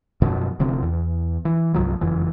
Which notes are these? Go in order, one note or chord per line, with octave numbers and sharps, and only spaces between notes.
F#2 B2 F3
D1 D2 C3 F3
E2
E3
C2 G2 F3 F#3
F#1 F2 E3